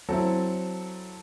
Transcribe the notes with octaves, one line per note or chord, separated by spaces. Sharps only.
F#3 C4 E4 A4